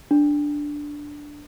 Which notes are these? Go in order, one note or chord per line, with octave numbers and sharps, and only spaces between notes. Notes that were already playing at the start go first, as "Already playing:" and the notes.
D4